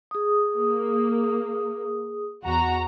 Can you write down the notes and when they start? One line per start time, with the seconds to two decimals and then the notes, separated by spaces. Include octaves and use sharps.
0.11 G#4 D#6
0.57 A#3
2.43 E2 F#4 A#5